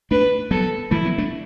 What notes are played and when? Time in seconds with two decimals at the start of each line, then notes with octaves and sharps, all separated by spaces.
0.11 A3 D4 B4
0.51 F#3 B3 A4
0.91 E3 A3 E4
1.05 F#3 B3
1.18 A3 D4